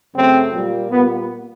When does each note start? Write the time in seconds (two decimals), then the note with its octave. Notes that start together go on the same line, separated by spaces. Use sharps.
0.14 F#2 C#3 F#3 A3 C4
0.53 A#2 G3 A#3
0.90 A#2 G3 A#3 B3